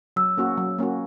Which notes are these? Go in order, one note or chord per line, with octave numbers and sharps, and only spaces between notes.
F#3 E6
A#3 C#4 F#4
F#3
A#3 C#4 F#4